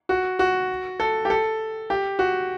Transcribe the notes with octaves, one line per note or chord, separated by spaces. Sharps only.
F#4
F#4
A4
G4
A4
G4
F#4